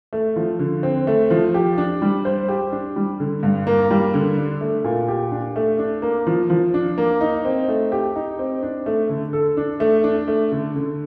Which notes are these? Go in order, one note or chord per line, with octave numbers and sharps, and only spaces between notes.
A3
F3
D3
C4
A3
F3
G4
D4
G3
C5
G4
D4
G3
D3
G2
A#3
G3
D3
D4
A3
A#2
G4
D4
A3
D4
A#3
F3
F3
D4
A#3
D#4
C4
A3
G4
D#4
C4
D4
A3
D3
A4
D4
A3
D4
A3
D3
D3